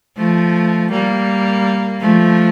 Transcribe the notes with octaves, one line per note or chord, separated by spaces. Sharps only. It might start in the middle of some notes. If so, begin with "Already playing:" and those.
F3 A3
G3 A#3
F3 A3